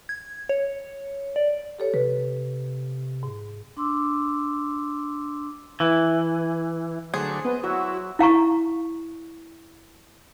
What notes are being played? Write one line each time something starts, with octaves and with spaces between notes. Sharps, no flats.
G#6
C#5
D5
G4 A4 C#5
C3 B4
G#2
D4 C6 D6 E6
E3
D3 F#3 A3 G#4 C5
B3 D#5
F#3 E4 F#4
E4 F5 A#5 C#6